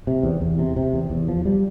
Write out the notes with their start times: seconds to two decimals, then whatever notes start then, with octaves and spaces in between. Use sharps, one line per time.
0.07 C3
0.23 E2
0.41 E2
0.59 C3
0.76 C3
0.93 E2
1.10 E2
1.28 F3
1.45 G3